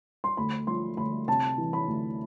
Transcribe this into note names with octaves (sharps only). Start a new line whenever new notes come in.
C6
D2 B5
F3 C6
D2 B5
C3 A5
E3
B5
D2